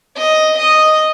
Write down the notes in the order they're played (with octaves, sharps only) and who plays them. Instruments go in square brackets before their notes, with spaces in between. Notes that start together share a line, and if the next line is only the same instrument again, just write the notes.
[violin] D#5
D#5